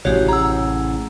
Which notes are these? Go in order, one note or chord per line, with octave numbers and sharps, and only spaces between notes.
A1 C3 F#4 G4 C#5
G#4 F#5 A#5 E6